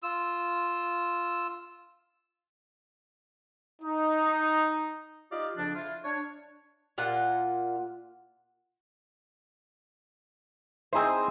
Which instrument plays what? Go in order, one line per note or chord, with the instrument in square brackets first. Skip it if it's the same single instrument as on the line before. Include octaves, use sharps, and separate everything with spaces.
[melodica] F4 E6
[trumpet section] D#4
[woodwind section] D#4 F4 G4 D5 D#5 F5
F2 C#3 F3 D4
E4 F4
D4 C#5
[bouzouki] A#2 F4 F#5
[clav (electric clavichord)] C4 D#4 E4 [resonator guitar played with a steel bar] G#4 C5